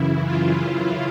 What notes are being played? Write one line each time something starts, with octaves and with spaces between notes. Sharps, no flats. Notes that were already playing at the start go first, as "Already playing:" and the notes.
Already playing: F#2 C#3 E3 E4
F4